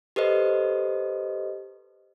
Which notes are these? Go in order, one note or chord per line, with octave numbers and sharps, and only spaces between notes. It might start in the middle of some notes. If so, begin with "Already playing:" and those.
G4 A4 B4 C5 D#5